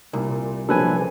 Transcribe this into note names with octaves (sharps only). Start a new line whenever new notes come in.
C2 A#2
A#1 A#2 C#3 F#3 A4 B4 G#5